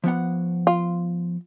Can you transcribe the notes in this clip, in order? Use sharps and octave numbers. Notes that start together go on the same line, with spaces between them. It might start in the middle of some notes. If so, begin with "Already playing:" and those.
F3 B3 F#5
F4